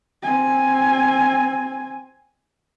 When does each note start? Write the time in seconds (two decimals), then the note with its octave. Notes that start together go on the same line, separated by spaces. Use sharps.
0.23 C4 G#5